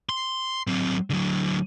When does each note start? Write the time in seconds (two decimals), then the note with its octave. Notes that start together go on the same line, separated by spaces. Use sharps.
0.09 C6
0.67 F#3 C4
1.10 D3 F#3